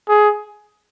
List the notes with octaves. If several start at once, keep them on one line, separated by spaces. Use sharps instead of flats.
G#4